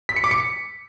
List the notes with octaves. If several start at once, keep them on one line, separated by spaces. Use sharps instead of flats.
B6
C#7
D6
C#7